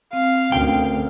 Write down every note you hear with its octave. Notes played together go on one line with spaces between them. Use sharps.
C4 F5
D2 C#4 A#4 G5